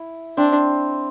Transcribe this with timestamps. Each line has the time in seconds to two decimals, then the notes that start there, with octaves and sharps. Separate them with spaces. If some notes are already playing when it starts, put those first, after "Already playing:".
Already playing: E4
0.37 C4 D4